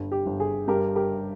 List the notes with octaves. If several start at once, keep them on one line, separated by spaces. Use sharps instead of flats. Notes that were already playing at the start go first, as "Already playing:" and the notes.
Already playing: G1 G3
G4
G1
G#4
G2 G4 A#4
G4 A#4